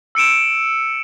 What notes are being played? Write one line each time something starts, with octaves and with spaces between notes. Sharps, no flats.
E6 C#7 D7 E7